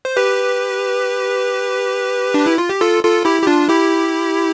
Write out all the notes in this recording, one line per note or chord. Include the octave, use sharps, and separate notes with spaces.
C5
G4 B4
D4
E4
F4
G4
F4 A4
F4 A4
E4 G4
G4
D4 F4
E4 G4